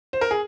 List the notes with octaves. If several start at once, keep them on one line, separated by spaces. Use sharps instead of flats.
C5
A#4
G#4